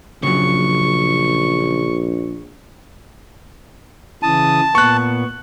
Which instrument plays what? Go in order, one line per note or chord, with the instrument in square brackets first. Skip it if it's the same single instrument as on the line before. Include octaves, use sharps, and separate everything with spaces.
[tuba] A#1 [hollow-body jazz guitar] C#3 F#3 [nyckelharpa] C#6
[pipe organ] C#3 E3 D#6 [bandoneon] A5
[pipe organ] A#2 B3 [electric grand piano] C#6 F#6